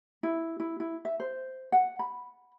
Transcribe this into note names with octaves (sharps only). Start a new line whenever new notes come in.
E4
E4
E4
E5
C5
F#5
B5